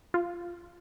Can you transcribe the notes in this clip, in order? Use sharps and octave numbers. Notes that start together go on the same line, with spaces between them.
F4